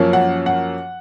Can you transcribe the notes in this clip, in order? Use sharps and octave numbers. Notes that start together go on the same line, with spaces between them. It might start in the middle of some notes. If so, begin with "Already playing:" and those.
Already playing: F#2 F3 A#3 C#4
F#5
F#5